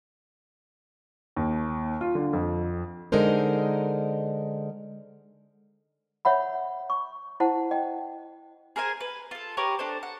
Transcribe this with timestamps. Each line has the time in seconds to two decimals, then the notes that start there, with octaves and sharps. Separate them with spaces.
1.36 D#2
2.01 F4
2.15 D3
2.33 F2
3.12 D3 G#3 D#4 A#4 C5
6.25 C#5 E5 F#5 B5
6.90 C#6
7.40 E4 C5 F#5 A5
7.71 D#5 G5
8.76 G#4 A#4 C5 G#5
9.01 B4
9.31 F4 A4
9.57 G4 A#4 B4 C#5
9.79 D4 A4 C5
10.03 F#5